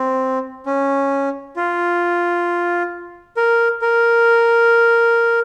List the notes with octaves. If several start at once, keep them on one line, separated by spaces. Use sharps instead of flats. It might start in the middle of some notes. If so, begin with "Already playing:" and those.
Already playing: C4
C#4
F4
A#4
A#4